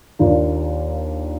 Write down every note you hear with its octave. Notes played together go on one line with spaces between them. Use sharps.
D#2 D#3 A#3 D4 F4